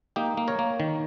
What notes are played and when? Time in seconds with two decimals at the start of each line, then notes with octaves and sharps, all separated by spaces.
0.16 A#3 D#4 G4
0.37 A#3
0.48 A#4 C#5
0.59 A#3
0.80 D#3